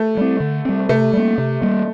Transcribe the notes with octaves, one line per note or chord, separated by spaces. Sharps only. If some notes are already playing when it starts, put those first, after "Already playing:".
Already playing: A3
G3 C4
D3
G3 C4
C3 A3
G3 A#3
C3
G3 A#3